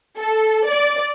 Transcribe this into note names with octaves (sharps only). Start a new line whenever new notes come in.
A4
D5